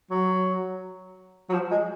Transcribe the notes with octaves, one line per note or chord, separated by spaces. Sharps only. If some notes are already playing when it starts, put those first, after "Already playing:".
F#3
F#3
F3
G#3